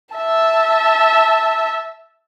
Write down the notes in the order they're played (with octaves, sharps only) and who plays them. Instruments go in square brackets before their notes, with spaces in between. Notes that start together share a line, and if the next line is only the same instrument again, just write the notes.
[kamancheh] E5 A5